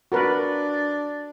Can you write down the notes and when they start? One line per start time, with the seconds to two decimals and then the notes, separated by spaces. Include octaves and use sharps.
0.12 D4 F#4 A#4 B4